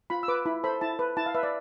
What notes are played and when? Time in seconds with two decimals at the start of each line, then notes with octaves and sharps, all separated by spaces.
0.10 F4 B5
0.23 E6
0.28 B4 D6
0.46 E4 B5
0.64 A4 C5 B5
0.81 E4 A5
0.99 B4
1.17 E4 A5
1.26 F5
1.35 B4 E5
1.43 D5